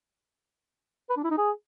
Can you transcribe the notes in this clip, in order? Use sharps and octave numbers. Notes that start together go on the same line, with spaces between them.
B4
D4
E4
D#4
G#4